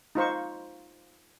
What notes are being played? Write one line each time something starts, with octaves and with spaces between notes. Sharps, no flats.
D#4 F4 C5 C#6